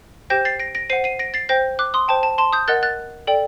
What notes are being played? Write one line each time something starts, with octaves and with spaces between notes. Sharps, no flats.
G4 C5 G5 G6 A#6
A6 C7
A#6 D7
A#6 D7
C5 F#5 C7 D#7
C7 D#7
A#6 D7
A6 C7
C5 G5 G6 A#6
D6 F#6
C6 D#6
C5 G5 A5
A5
A5 C6
D#6 G6
A#4 D#5 F#5 F#6 A6
F#6 A6
A4 D5 G5